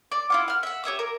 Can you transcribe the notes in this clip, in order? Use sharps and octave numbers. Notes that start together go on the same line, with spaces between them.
D5
E4 F4 F#5
F#5 F6
E5 F#5
G4 C#5 E5 D#6
A#4